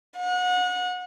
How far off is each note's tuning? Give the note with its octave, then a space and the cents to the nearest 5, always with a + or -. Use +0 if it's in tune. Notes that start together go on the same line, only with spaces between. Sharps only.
F#5 -30